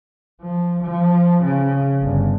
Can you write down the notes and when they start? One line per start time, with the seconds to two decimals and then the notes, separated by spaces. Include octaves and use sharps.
0.42 F3
0.83 F3
1.44 C#3
2.02 G1